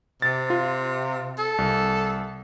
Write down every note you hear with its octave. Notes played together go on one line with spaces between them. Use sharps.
C3 A6
F4
A4
C2